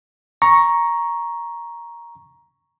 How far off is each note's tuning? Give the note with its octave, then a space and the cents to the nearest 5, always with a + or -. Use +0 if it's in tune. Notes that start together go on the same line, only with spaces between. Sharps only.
A#5 +10 C#6 +0